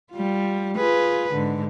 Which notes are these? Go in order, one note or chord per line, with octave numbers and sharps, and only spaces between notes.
G3 F4
F4 G#4 B4
G#2 D3